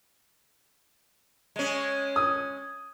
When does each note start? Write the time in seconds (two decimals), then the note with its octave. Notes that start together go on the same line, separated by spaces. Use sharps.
1.56 G#3 C#4
2.16 D#6